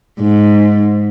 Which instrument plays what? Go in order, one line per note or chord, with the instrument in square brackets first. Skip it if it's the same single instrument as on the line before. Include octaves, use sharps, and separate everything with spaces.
[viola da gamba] G#2